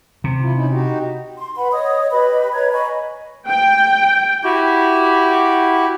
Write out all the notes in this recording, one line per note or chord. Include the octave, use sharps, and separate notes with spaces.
C3
E4 F4
C#4 D#4 E4
D#4 F#4 G4
C6
B4 F#5 B5
C#5 D#5 D#6
G4 B4 D#5 B5
B4 C#5 A#5 G#6
D#5 G#5 B5 C#6
G5
E4 F#4 G4